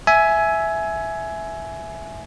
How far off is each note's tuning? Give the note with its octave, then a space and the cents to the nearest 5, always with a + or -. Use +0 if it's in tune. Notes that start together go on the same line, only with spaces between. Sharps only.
E5 +0 G#5 +15